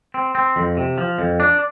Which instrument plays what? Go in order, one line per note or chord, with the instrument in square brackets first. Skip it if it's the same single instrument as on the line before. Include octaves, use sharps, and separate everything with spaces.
[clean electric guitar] C4
C4
F2
C3
F3
F2
D4